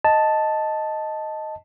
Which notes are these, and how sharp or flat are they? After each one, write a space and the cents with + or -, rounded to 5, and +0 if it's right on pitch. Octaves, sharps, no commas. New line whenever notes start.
D#5 +5 A5 +0